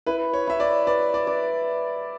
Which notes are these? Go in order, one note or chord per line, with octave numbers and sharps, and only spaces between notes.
E4 B4
C#5
E4 E5
D5
B4 D5
D5
D5